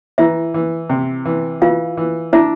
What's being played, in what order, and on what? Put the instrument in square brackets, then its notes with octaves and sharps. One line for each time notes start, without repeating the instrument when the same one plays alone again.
[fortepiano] E3 [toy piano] E4 E5
[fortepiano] E3
C3
E3
[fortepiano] E3 [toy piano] F4 F5
[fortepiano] E3
[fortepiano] D4 [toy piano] E4 E5